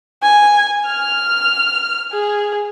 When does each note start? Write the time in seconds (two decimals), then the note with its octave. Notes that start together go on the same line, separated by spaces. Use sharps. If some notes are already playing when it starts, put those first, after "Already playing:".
0.23 G#5
0.87 F6
2.12 G#4